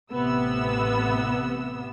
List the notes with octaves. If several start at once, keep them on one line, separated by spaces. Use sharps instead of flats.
A1 C3 B3 E6